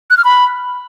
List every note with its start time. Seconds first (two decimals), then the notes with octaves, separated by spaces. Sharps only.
0.10 F#6
0.17 F6
0.24 B5